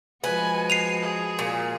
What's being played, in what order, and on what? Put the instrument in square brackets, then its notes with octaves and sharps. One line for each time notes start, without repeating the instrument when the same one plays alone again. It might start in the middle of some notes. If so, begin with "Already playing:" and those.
[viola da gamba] F3 G#3 F#4 [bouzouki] B4 [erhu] G#5
[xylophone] C7 D#7 F7
[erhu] G#4
[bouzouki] A#2